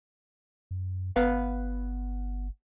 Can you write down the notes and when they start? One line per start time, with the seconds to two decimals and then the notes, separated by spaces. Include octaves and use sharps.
0.71 F#2
1.16 G1 B3 B4 F5